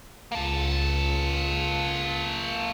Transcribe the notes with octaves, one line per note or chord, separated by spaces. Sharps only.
C#2 A#3 A4